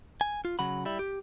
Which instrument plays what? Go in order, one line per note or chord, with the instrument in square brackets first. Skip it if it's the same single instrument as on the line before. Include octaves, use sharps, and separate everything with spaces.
[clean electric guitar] G#5
F4
C#3 F#3 F#5 B5
G3 E4
G4